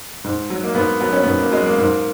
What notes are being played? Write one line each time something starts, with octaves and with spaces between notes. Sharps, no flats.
G#2
F#3
A#3
G#2 B3
F#3 B3
C#4
B3
G#2
A#3
F#3 G#3
A#3
G#2